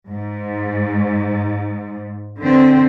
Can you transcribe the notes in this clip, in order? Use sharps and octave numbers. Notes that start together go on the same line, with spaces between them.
G#2
D3 C4